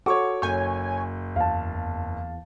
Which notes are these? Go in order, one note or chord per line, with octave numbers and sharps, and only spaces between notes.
F#4 A4 C#5 C#6 D6
F#1 C#5 G#5 G6
E2 F5 A5